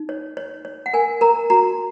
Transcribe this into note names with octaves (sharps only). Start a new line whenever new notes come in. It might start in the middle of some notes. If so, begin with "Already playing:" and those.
Already playing: D#4
C#5
C#5
C#5
F#5
A#4 G#5
A#4 A#5
F#4 A#5